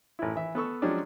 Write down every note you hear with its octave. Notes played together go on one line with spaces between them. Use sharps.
A1 E4
E3 E5
B3 A4 C#6 E6
F3 F#3 G#3 C#4 D4 G4